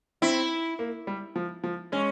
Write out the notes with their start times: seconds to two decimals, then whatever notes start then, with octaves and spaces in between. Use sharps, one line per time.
0.22 C4 E4
0.79 A#3
1.07 G3
1.36 F3
1.64 F3
1.92 G#3 C#4